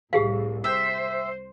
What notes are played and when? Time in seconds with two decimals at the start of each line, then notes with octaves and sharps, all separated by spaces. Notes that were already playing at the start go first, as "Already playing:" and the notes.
0.13 C2 A2 G4 G#4 F5
0.64 C5 E5 G5